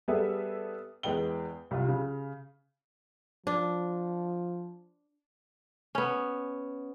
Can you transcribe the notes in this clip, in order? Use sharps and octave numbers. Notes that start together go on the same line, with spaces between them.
G3 B3 G#4 A4 B4 E5
E2 G#3 B4 G5 G7
C2 F4
C#3
F3 D4
B3 C#4